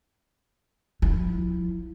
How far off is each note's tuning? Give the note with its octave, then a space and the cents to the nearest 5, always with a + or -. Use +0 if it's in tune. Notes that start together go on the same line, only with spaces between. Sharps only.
F3 +30 E4 +0